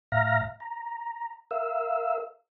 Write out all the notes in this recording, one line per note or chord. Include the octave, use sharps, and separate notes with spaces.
A2 E5 F5 A#5 F6 A#6
A#5
A#4 E5 F5 E6